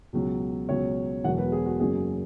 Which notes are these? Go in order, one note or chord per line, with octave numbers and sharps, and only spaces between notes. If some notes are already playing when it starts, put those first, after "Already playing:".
C#2 B2 F#3
C#2 B2 F#3 C#5
E1 E2 B2 F#3 F#5
B4
G#4
F#4
F#1 F#2 F#3 G#4